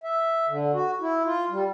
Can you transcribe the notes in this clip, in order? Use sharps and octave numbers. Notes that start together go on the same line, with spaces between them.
E5
D3
F#4
E4
F4
G3